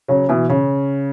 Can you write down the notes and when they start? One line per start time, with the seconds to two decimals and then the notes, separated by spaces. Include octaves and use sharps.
0.08 C#3 F#3
0.29 B2 E3
0.49 C#3